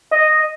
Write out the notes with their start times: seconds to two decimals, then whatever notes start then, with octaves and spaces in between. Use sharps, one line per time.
0.12 D#5